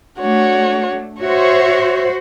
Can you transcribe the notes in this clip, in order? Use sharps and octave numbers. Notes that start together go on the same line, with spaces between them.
A3 D4 F#4 C#5
F#4 C5 C#5 E5